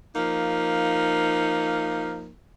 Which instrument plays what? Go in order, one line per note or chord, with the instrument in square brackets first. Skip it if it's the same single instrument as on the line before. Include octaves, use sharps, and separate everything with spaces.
[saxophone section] F3 A#3 D#4